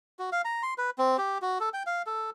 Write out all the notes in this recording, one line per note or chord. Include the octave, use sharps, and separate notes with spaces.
F#4
F5
A#5
C6
B4
C4
G4
F#4
A4
G5
F5
A4